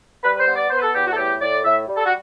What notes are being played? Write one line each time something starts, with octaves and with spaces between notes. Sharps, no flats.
G3 B4
B4
C5
B3
D5
B3 C5
B4
A4
E2 G4
F#4
A4
A2 G4
A2 D5
A2 E5
G3
A4
F#4